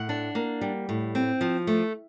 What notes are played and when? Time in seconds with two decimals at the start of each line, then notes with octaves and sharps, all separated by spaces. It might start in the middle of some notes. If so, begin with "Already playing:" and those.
Already playing: A2 F#5
0.09 D4
0.35 A#3
0.61 G3
0.89 A2
1.15 C4
1.41 F3
1.67 A3